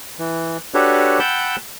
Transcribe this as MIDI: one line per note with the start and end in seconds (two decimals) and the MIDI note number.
0.19 0.57 52
0.74 1.19 62
0.74 1.19 66
0.74 1.19 67
0.74 1.19 69
0.74 1.19 71
0.74 1.19 73
1.19 1.56 78
1.19 1.56 79
1.19 1.56 81
1.19 1.56 83
1.19 1.56 88
1.19 1.56 91